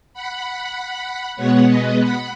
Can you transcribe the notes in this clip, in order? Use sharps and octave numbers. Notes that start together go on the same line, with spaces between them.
F#5 B5
B2 G#3 B3 C#5 F#5
B4 D#5
F#5 B5